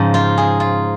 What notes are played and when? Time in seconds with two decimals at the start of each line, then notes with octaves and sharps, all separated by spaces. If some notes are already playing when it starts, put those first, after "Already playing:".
Already playing: G#2 C#3 F3
0.14 F4
0.38 G#4
0.60 F4